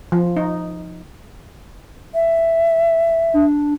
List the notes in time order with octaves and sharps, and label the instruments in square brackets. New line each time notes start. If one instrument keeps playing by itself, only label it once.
[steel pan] F3
D#4
[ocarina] E5
[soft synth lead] D4